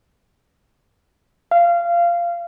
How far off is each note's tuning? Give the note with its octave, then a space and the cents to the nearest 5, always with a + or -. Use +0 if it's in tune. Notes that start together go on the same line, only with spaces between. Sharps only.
F5 -20